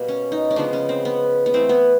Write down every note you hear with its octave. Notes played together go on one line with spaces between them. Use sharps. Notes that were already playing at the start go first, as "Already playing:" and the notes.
Already playing: B2 G3 A#3
C#4
D#4
C#4
C#3 F3 G#3 B3 D4
C#4
C4
B3
B3
E3 A3 C4
B3